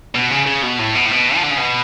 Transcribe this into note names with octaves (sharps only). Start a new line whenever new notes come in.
B2
C#3
C#3
B2
A2
B2
A2
B2
F3
D3
C#3
B2